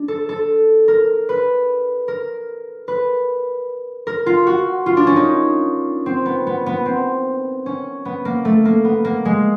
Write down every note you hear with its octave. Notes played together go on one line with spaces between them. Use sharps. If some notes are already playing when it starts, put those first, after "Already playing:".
Already playing: D4
A4
A4
A#4
B4
A#4
B4
A#4
F4
F#4
F4
D4
C#4
D#4
C4
B3
B3
B3
C4
C#4
B3
A#3
A3
A#3
B3
A#3
G#3